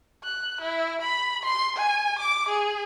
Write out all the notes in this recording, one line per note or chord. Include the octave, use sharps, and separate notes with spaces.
F#6
E4
B5
C6
G#5
D6
G#4